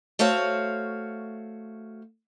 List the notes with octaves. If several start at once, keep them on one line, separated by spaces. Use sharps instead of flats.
A3 F#4 C5 C#5 F5